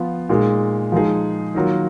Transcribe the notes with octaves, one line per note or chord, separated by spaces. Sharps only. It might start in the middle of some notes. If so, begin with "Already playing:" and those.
Already playing: F3 B3 F4
A#2 G#3 D#4 G#4
F3 G#3 D#4 G#4
D#3 F#3 A#3 F4 A#4